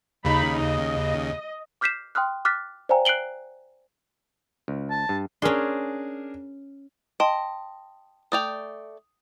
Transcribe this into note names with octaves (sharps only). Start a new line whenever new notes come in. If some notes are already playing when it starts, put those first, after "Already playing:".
D#2 C#3 D#4 B5
D#5
D6 F6 G6 B6 C7 E7
G5 C6 D#6 F6 F#6
D6 F6 F#6 A6 B6
C5 D5 F5 G5 G#5 A#5
F#6 C7 D7 F#7 G7
C#2
A5
G2
C#4 D4 G#4 A#4 C6
D#5 G5 A5 C6
A3 D5 G5 D#6 F7